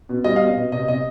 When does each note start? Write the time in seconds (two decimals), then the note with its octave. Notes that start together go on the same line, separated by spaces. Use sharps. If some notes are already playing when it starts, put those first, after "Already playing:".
0.09 B2
0.24 G3 D#5
0.36 B2 F5
0.48 D#5
0.57 B2
0.72 C3 D#5
0.88 C3 D#5